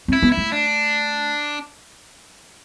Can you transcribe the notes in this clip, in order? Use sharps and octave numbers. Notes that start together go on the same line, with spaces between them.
C4 E4
B3
E4
A3
D4